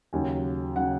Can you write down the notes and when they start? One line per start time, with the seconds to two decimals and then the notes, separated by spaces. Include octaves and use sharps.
0.13 D#2 C#3 F#3 G#5
0.76 C#3 F#3 F#5